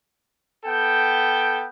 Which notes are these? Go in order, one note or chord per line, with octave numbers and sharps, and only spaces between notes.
B3 A4 G5